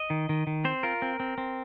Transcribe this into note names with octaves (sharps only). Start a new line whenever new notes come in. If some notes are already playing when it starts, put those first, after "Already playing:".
Already playing: D#5
D#3
D#3
D#3
C4 C5
F4 A#4
C4
C4
C4